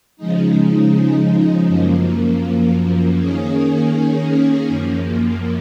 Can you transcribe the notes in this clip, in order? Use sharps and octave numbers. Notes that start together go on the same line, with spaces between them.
C#3 F3 G#3 D#4
F#2 F3 A#3
D#3 A#3 C#4 G#4
F#2 F3 A#3